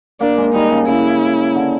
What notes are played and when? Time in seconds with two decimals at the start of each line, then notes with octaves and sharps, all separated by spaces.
0.20 A#3 D4
0.37 G#3
0.54 G3 D#4
0.71 C#3
0.87 C#3 E4
1.55 D3